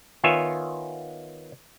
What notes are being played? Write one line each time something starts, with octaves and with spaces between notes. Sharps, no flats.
D#3 B3 F4 C#5 E5 G#5